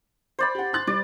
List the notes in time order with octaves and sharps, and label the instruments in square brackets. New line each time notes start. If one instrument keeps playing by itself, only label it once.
[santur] C5 D5 B5
[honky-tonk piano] G4 F#5
C6 F#6 A6
[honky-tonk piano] G3 [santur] D5